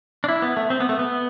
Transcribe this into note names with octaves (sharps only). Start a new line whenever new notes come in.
D4
E4
B3
A3
C4
B3
A3
B3